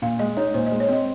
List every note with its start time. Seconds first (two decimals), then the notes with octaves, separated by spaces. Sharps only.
0.02 A#2 F5
0.19 G#3 D#5
0.37 D#4 C#5
0.54 A#2 C5
0.66 D#5
0.71 G#3
0.80 C#5
0.89 C4 D#5